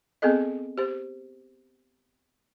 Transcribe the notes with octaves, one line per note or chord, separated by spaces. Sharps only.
B3 C4 G#4 A4 D#5
G4 C5